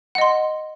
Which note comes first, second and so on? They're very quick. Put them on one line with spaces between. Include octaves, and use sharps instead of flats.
F#5 D#5 C6